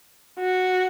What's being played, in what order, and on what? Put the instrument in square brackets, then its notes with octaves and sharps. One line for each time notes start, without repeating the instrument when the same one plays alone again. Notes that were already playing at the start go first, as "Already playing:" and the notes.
[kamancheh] F#4